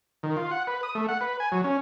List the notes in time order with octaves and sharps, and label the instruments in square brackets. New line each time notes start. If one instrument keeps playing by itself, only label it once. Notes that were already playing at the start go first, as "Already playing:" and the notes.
[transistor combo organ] D#3
F4
F#5
B4
D#6
A3
F#5
B4
G#5
F#3
C#4